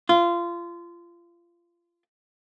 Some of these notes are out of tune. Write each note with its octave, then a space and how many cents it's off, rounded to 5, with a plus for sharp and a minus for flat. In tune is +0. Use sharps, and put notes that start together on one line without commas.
F4 -25